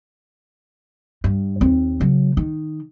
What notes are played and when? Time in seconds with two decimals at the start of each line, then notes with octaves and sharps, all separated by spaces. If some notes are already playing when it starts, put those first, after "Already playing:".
1.24 G2
1.61 D#2 C4
2.00 C#3 F#3
2.37 D#3